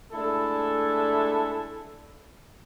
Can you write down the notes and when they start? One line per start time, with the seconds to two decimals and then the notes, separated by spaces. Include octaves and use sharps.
0.12 G#3 A3 D4 E4 A4